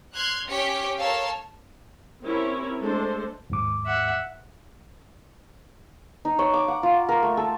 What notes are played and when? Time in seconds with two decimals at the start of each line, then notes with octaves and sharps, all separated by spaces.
0.14 C6 F6 F#6 G#6
0.46 C#4 G4 B6 C#7
0.99 A4 A#4 C#5 F5 A5 E6
2.24 C4 C#4 E4 G4 A#4 C#5
2.82 G#3 A3 D4 A4 C5
3.50 D#2 G#2 D6
3.86 E5 F#5
6.25 D#4
6.39 C#5
6.54 D6
6.68 F#5
6.83 F4
7.09 A#4
7.23 A3
7.37 A4